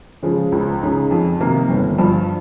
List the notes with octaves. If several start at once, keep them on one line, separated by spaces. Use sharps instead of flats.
C#3 F3 G#3
C#2
C#3 G#3 D#4
F2
C3 D#3 A#3
G1
G2 F3